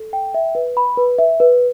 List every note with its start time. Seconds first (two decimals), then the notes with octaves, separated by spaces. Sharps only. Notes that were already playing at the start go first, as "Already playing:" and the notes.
Already playing: A4
0.13 G5
0.34 E5
0.55 B4
0.77 B5
0.97 B4
1.18 E5
1.40 B4